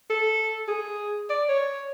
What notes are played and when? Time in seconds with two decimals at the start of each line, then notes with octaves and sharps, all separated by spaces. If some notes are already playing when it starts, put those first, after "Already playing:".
0.10 A4
0.68 G#4
1.30 D5
1.49 C#5